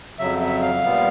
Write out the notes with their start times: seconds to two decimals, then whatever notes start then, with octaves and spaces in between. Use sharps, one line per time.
0.19 F2 C#3 F#3 E5
0.41 E5
0.62 F5
0.84 A#2 G3 B3